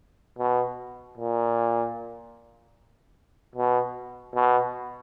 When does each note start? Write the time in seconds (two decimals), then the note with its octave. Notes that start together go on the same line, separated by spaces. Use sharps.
0.39 B2
1.18 A#2
3.55 B2
4.34 B2